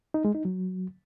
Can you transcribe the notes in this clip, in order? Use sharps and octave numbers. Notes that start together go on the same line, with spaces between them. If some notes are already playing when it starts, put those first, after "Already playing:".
D#4
G#3
D#4
F#3